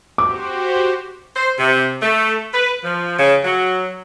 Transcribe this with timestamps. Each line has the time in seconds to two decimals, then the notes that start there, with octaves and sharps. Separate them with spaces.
0.18 F#4 G4 C5 D6
1.36 C5
1.59 C3
2.02 A3
2.53 B4
2.84 F3
3.18 C#3
3.44 F#3